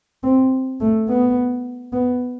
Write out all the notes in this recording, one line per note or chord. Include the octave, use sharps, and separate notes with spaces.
C4
A3
B3
B3